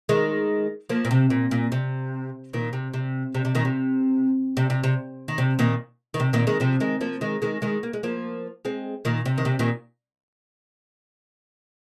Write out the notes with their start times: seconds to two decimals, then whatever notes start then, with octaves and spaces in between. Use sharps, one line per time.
0.09 D#3 G#3
0.89 F3 A#3
1.05 A#2
1.11 C3
1.30 A#2
1.51 A#2
1.72 C3
2.53 A#2 D#3
2.73 C3
2.94 C3
3.35 C3
3.45 C3
3.55 A#2 D#3
3.65 C3
4.57 C3
4.70 C3
4.84 C3
5.28 D#3
5.38 C3
5.59 A#2 D#3
6.14 D#3
6.20 C3
6.33 A#2 D#3
6.47 D#3 G#3
6.60 C3 F3
6.80 D#3 G#3
7.01 F3 A#3
7.21 D#3 G#3
7.42 D#3 G#3
7.62 D#3 G#3
7.83 A#3
7.93 G#3
8.03 F3 A#3
8.65 G#3 C4
9.05 A#2 D#3
9.26 C3
9.38 D#3
9.45 C3
9.59 A#2 D#3